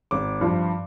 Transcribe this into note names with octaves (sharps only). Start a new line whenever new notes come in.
G#1 D6
G2 F3